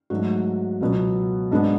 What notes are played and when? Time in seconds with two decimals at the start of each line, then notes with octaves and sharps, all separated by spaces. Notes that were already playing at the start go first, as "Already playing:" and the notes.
0.10 G#2 F#3 A3 F#4
0.81 C#2 B2 F#3 B3
1.51 G#2 G#3 B3 D4